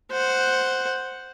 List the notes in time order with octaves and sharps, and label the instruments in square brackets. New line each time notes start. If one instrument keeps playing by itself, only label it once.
[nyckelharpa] C5 F#5